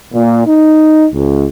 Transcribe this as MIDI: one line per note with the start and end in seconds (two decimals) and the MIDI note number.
0.14 0.44 46
0.47 1.05 63
1.13 1.46 37